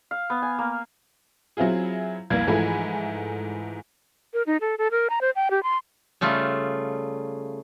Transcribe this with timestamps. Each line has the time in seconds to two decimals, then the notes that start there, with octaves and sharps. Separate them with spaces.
0.11 F5
0.30 B3
0.42 G#5
0.58 A#3
1.57 F#3 C4 E4 F4 G#4
2.30 F1 C2 A#3 G#6
2.47 G#2 E3 F3 A3 G#5 B5
4.34 A#4
4.47 D#4
4.61 A4
4.78 A4
4.91 A#4
5.10 A#5
5.21 C5
5.36 G5
5.51 G4
5.63 C6
6.21 C#3 G3 A3 F4